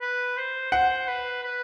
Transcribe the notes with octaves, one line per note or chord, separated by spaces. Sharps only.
B4
C5
C5 F#5
B4
B4